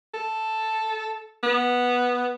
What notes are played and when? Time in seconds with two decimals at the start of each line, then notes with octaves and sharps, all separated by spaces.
0.14 A4
1.43 B3